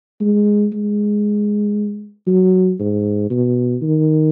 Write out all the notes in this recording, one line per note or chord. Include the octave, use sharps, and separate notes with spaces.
G#3
G#3
F#3
G#2
B2
D#3